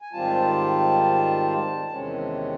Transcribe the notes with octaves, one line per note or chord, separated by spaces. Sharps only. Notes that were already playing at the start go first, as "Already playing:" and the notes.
G#5
G#2 D#3 G3 C4 F4 A5
E2 C3 D#3 G#3 C#4